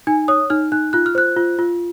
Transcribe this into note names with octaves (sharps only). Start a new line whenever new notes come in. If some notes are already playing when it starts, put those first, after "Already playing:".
D#4 G#5
C#5 D#6
D#4 F6
D#4 F#6
F4 F#6
F6
C5 F#6
F4
F4